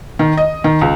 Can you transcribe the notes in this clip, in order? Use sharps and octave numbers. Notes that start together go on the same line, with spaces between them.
D#3
D#5
D#3
C#2